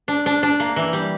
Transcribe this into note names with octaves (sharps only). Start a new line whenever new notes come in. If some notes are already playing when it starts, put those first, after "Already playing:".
D4
D4
D4
A#3
E3
G3